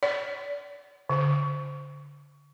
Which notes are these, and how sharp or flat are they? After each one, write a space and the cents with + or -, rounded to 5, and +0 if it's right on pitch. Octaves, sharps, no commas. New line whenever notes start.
D5 -35
D3 -35